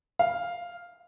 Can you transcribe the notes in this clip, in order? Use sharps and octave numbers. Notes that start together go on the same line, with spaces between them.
F5